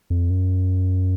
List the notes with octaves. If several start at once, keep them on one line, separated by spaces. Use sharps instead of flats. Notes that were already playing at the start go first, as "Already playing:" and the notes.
F2
F#2